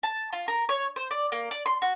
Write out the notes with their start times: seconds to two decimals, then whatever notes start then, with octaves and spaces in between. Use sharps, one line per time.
0.03 A5
0.33 F4
0.48 A#4
0.69 C#5
0.96 C5
1.11 D5
1.32 A#3
1.51 D5
1.66 C6
1.82 F#4